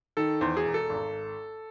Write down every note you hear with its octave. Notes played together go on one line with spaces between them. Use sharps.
D#3 A4
E2 C5
G#4
E1
A4
G#1